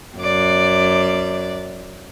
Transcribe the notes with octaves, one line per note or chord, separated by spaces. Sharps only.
F#2 D5